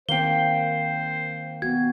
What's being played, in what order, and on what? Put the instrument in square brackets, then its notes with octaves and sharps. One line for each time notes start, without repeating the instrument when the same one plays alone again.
[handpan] D#3 C4 [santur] A#3 G5 [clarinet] C5 [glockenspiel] G7
[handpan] B3 F#4 [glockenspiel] G#6